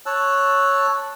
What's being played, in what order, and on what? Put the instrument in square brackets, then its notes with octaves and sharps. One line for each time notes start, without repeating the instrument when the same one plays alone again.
[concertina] C#5 A5 E6 F#6